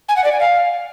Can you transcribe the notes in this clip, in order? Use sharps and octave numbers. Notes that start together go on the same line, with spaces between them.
G#5
F#5
D5
G#5
F5